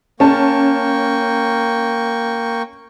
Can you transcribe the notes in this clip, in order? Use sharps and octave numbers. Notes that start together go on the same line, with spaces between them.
A#3 C#4 G5 A5 C#6